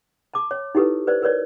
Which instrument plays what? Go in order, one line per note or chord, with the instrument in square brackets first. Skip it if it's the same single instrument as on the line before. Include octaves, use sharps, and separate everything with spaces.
[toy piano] A5 D6
C#5
D#4 E4 G4 A4 B4
B4 C5 D5
A#4 B4 C#5 D5